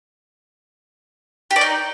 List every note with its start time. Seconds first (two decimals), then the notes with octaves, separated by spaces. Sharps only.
1.51 G4
1.56 D5
1.61 D#4